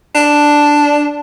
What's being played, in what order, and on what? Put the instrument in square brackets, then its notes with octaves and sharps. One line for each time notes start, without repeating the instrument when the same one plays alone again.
[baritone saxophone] D4